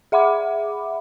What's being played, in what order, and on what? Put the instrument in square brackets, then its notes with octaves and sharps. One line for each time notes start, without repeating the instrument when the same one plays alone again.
[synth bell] G#4 E5 F#5 B5 D6